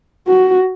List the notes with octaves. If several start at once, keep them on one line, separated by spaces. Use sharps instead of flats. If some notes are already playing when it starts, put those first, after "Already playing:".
F#4